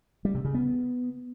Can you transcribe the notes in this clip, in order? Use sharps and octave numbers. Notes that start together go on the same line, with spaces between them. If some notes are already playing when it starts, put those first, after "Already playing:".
G3
C3
C#3
B3